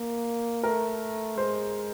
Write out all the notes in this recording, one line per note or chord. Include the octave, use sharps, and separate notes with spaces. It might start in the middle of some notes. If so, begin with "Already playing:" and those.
Already playing: A#3
A3 A#4
G#3 C5